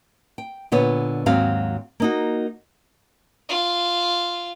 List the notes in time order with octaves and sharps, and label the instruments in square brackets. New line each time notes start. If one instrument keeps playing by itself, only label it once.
[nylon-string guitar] G5
A#2 D3 B3 C#5
D#2 G#2 F#3 C4 F#4 F5
A#3 D#4 F#4
[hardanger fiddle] F4